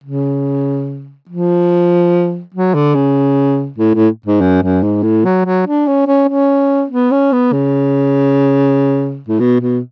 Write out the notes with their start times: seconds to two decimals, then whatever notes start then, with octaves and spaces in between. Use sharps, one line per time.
0.04 C#3
1.29 F3
2.54 F#3
2.74 D3
2.95 C#3
3.78 A2
3.94 A2
4.26 G#2
4.41 F#2
4.62 F#2
4.83 G#2
5.03 A2
5.25 F#3
5.45 F#3
5.66 D4
5.87 C#4
6.07 C#4
6.28 C#4
6.90 B3
7.11 C#4
7.32 B3
7.52 C#3
9.28 A2
9.40 B2
9.61 B2